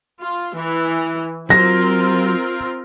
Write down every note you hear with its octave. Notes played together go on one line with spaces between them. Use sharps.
F4
E3
F#3 C4 F4 A#4 A#6